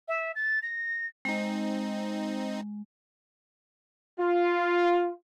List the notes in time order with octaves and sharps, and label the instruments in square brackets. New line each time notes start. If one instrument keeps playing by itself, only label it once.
[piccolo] E5
A6
A#6
[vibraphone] G#3 [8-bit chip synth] C4 D#4
[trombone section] F4